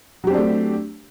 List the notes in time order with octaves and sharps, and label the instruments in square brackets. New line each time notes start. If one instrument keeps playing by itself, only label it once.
[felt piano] F#3
G4
C4
D4
A3